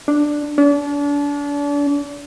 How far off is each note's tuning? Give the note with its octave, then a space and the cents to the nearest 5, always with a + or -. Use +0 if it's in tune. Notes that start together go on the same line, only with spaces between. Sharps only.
D4 +5
D4 -35